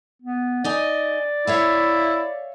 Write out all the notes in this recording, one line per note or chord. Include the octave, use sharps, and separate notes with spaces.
B3
D#4 D5 D#5 G#5
E4 C#5 E5 F5